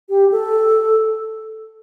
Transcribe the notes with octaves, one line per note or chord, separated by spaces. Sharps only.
G4
A4